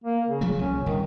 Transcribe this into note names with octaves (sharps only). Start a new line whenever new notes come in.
A#3
C#3
F3 F#3 A3
C2 A#2 C#4
G1 C2 D#3